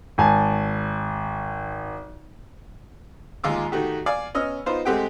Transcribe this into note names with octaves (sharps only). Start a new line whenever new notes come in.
G#1 G#5 A5
D#2 A#2 G#3 F4 D6 E6
D#3 A3 F#4 G4
D5 F5 G#5
B3 C#4 D#5 E6 F6
B3 D#4 F4 C5
G#3 A3 C4 G4 F#5 G5